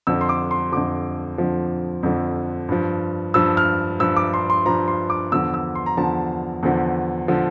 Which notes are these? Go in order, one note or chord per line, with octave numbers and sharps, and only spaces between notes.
F2 D3 F3 E6
C6
D6
C6
F2 D3 F3 D6
F2 D3 F3
F2 D3 F3
G2 F3
G2 F3 E6
F6
G2 F3 E6
D6
C6
C6
G2 F3 A#5
C6
D6
E2 D3 F3 E6
E6
C6
A#5
E2 D3 F3 A5
E2 D3 F3
D3 F3